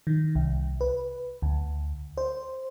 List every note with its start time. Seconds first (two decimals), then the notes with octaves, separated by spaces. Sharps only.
0.07 D#3
0.35 C2
0.81 B4
1.42 D2
2.17 C5